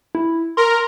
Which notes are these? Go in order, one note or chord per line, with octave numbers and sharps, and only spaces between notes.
E4
A#4 C6